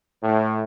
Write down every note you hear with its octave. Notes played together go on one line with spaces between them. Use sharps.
A2